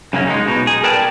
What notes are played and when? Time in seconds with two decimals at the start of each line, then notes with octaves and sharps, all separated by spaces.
0.13 F#2 C#3 F#3 A#3 C#4
0.27 G#3 D#4
0.48 B2 D#4
0.67 G#4
0.84 A#4 B4 D5 G5 A5